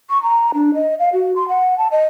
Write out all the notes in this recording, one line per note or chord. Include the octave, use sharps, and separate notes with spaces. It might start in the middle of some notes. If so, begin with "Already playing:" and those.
C#6
A#5
D4
D#5
F5
F#4
C6
F#5
A5
D#5